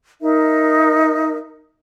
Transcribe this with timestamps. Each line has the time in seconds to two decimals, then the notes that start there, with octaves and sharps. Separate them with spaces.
0.21 D#4 A#4 E5